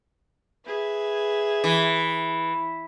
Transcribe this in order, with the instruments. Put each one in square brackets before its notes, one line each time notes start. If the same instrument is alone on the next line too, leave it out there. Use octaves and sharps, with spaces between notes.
[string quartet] G#4 B4 E5
[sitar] E3